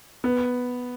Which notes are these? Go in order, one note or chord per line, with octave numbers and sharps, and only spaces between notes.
B3